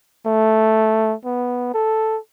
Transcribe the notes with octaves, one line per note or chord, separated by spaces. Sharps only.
A3
B3
A4